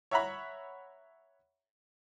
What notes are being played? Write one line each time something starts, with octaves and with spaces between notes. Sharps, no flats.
C#5 E5 F#5 A#5 B5